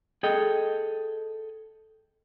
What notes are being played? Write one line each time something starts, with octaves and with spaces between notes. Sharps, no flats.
G#4 A4 D#5 G5